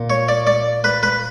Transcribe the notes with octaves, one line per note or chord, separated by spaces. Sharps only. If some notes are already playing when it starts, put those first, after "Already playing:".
Already playing: A#2
C#5
D5
D5
B4
B4